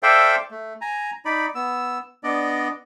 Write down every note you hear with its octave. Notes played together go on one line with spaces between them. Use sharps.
A4 C5 D5 E5 F5 G5
A3
G#5 A#5
D#4 D5 B5
B3 E6
B3 D4 D5 D#5